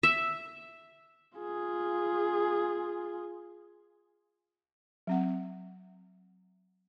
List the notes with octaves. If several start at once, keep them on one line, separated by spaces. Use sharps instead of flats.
E5
F4 G#4
F#3 C4 F#5